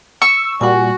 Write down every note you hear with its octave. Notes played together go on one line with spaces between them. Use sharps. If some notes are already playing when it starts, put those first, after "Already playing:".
C#6 E6
A#2 G3 F#4 F#5 G#5